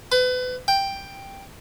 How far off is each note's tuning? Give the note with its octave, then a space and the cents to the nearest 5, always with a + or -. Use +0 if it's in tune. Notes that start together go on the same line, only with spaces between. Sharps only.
B4 +30
G5 +5